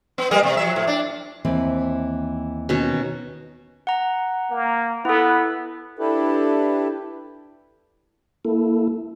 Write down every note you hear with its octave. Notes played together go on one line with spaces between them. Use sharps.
B3
G3 A#3 D#5
C3
F3 F#3 E5
A2
D4
D#2 E3 C4
B2 D#3 C#4
F#5 A#5
A#3
B3 E4 A4
D4 E4 G4 A4 B4
A#3 E4 A4